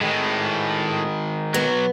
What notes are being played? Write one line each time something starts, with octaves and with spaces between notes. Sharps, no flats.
A2 D#3 G#3
B1 F#3 B3